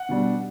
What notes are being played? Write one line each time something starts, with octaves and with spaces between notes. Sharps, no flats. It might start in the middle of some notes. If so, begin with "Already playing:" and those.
Already playing: F#5
B2 G3 D4